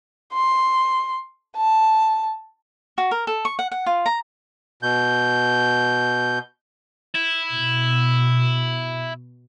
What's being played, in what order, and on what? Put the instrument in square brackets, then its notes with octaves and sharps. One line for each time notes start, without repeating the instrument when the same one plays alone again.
[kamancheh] C6
A5
[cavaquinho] F#4
A#4
A4
C#6
F#5
F#5
F4
A#5
[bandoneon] B2 G6
[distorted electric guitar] E4
[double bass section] B2